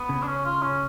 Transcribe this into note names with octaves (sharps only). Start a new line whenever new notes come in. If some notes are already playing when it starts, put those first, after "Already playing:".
Already playing: B3
C#3
D4
C#4
F4
C#4